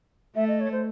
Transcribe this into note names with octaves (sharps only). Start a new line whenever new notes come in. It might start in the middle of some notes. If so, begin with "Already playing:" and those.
A3 E5
D#5
C#5
C5